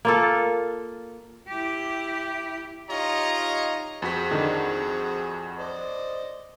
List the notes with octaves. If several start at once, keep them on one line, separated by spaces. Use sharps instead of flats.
A#3 F4 A4
E4 G4
D#4 F4 G4 C#5 D#5 A#5
F2 C4 F#4 G#4 B6
D3 D#3
C5 D5 D#5